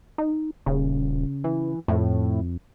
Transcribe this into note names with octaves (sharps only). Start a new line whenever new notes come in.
D#4
D#1 C#3
E3
F2 A2